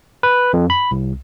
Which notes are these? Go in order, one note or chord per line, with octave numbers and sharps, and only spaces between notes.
B4
F2
B5
C2